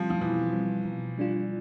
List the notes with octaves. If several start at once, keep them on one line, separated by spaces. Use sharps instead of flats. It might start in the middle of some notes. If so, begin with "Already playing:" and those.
Already playing: B2 F3 G3 C4
F3
B2 E3
G3 C4
B2
G3 D4 F4